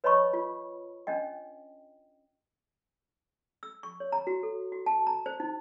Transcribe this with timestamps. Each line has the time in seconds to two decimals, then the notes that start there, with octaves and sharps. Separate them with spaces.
0.04 B4 C#5 D#5 A5 B5 C#6
0.33 F4
1.07 C#4 D4 D#5 G5
3.63 E6
3.83 C#6
4.00 C#5
4.12 A#5
4.27 F#4
4.43 A4
4.72 F#4
4.86 A5
5.07 A#5
5.26 C5
5.40 D#4